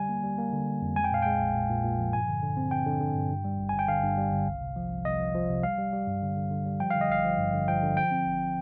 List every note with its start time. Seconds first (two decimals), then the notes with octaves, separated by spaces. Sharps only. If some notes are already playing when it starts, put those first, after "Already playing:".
Already playing: D3 G3 G#5
0.09 A#3
0.24 G3
0.38 A#3
0.53 D3
0.67 G3
0.82 F2
0.96 G#3 G#5
1.04 G5
1.11 A#2 F5
1.22 G#3 G5
1.40 A#1
1.55 A#2
1.69 A#2
1.84 A#2
1.99 F3
2.13 G2 G#5
2.28 D3
2.43 D3
2.57 C4
2.71 D3 G5
2.86 D3
3.01 D3
3.15 G2
3.30 G2
3.44 G3
3.59 G1
3.69 G1 G#5
3.79 G5
3.88 D3 F5
4.03 G2
4.17 G3
4.32 G1
4.47 C2
4.61 C3
4.76 F3
4.90 C2
5.05 C2 D#5
5.20 F3
5.34 F3
5.49 C3
5.63 G3 F5
5.78 G3
5.93 G3
6.07 G2
6.22 D3
6.36 D3
6.51 D3
6.66 G3
6.80 F3 G5
6.91 D3 F5
7.01 D#5
7.10 G#1 F5
7.24 F3
7.39 G2
7.53 D3
7.68 F3 G5
7.83 D3
7.97 F3 G5
8.11 C4
8.26 G1